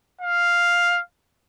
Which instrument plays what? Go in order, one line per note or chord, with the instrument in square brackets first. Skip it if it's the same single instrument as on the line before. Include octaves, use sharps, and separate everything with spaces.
[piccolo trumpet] F5